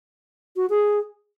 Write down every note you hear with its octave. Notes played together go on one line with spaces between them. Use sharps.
F#4
G#4